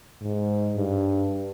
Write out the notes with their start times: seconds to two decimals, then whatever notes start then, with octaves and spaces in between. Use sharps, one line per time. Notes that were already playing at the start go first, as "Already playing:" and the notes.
0.21 G#2
0.76 G2